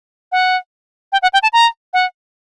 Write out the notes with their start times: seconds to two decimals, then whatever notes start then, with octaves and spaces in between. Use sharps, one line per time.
0.32 F#5
1.12 G5
1.22 F#5
1.33 G5
1.43 A5
1.53 A#5
1.93 F#5